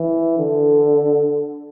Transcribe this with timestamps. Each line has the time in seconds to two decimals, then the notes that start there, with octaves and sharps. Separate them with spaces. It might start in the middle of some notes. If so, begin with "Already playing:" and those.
Already playing: E3
0.39 D3